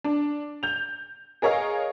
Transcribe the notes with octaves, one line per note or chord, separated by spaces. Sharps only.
D4
G6 F7
G#4 A#4 C#5 D#5 F5